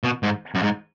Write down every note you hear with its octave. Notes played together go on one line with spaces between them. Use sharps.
B2
G#2
F#2
G#2